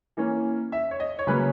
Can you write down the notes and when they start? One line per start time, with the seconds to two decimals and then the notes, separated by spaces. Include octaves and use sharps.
0.17 E3 A#3 C#4
0.72 E5
0.91 C#5
1.00 D#5
1.19 C#5
1.27 C#3 F#3 A#3 C#4 B4